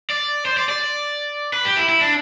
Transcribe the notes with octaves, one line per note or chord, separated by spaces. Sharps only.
D5
C5
D5
D5
B4
G4
E4
E4
D4